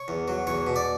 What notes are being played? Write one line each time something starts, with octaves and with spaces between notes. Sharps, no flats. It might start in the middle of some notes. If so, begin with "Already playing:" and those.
Already playing: C#5
E2
F#3
E2 C#5
B2
D5